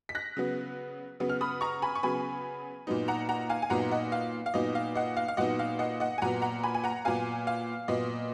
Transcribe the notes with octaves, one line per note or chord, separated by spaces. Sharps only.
B6
F#6 A#6
C#3 F#3 B3
C#3 F#3 B3
F6
B5 D#6
A#5 C#6
G#5 B5
C#6
C#3 F#3 B3 G#5 B5
A#2 F#3 B3 D#4
F#5 A#5
F#5 A#5
F5 G#5
G#5
A#2 F#3 B3 D#4 F#5 A#5
D#5 F#5
F5
F5
A#2 F#3 B3 D#4 D#5
F5
D#5 F#5
F5
F5
A#2 F#3 B3 D#4 D#5 F#5
F5
D#5 F#5
D#5 F#5
G#5
A#2 F#3 B3 F#5 A#5
F#5 A#5
G#5 B5
G#5
F#5 A#5
A#2 F#3 B3 F5 G#5
F5
A#2 F#3 B3 D#5